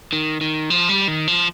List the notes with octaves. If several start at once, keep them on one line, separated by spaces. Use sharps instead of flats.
D#3
D#3
F3
G3
D#3
F3